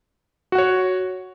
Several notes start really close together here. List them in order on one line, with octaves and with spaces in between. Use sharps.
F#4 F#5 C#5